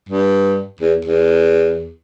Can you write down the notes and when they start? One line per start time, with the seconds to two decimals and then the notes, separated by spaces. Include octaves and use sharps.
0.09 G2
0.81 E2
1.05 E2